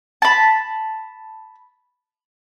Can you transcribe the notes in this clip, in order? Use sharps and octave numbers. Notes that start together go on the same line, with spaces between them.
A5 B5